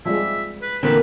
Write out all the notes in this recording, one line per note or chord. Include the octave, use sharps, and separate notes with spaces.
F3 G3 G#3 E5
B4
E2 A#2 D3 C4 A#4 B4